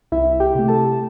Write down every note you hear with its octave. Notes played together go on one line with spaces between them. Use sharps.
C2 E4 E5
G4 G5
C3 A3
A4 A5